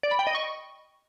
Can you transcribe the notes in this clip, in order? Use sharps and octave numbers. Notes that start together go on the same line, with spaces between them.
D5
B5
G5
D#5
C#6